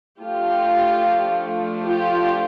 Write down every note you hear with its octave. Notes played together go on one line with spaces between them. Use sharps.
F3 A3 D4 F4 G4
F4 G4